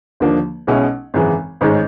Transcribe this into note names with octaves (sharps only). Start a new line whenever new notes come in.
D#2 D3 F3 A#3 D4
B1 B2 G#3 C#4 E4
G#1 F#2 C#3 E3 G#3
A1 G#2 D#3 G#3 C#4